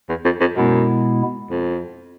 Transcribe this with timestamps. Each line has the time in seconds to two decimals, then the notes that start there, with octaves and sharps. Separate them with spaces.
0.09 E2
0.25 F2
0.40 F2
0.56 F#2 B2 G#3 B3 E4
1.51 F2